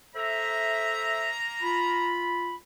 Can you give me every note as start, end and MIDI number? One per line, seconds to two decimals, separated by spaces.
0.15 2.10 58
0.15 1.31 69
0.15 1.31 72
0.15 1.31 76
0.15 2.10 82
1.62 2.55 65
1.62 2.55 83